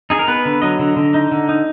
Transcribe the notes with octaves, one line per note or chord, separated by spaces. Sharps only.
D#4 G#4
A#4
B3 B4
D3
F#3 D#5
D3
D3
D#4
D3
D#4